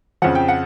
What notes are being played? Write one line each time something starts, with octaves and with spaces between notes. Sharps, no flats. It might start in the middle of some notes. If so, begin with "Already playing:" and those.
F2 C#3 F3 F#5
G5
F#5